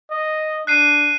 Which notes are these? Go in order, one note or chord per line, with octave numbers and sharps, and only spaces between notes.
D#5
D4 F#6 C7 D#7